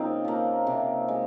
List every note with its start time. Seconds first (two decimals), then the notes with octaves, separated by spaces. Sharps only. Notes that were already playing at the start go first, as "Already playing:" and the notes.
Already playing: C#3 A#3 C4 D#4 F4
0.25 F3 A#3
0.67 C3
1.08 G#3